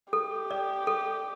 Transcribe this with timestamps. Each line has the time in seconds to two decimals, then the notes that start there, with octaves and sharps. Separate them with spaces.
0.12 G4 A4
0.51 D5
0.87 A4